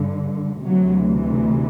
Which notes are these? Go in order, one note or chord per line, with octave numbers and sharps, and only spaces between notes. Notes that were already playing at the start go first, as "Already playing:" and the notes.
Already playing: G2 D3
D2 C3 E3 F#3